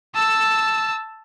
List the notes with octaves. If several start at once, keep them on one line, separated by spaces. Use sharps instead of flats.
A5 E6